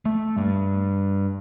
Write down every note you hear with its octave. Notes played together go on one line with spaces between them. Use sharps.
A3
G2